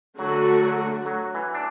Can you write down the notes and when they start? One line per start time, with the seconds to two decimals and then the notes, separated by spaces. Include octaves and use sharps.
0.19 D3 F#3 A3 F#4
0.62 F#3
1.06 F#3
1.34 E3
1.54 D4